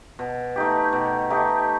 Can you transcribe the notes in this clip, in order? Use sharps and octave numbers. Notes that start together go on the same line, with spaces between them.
B2
A3 D#4 G4
B2
A3 D#4 G4